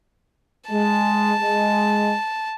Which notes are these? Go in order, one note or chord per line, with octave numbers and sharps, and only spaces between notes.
G#3 A5
G#3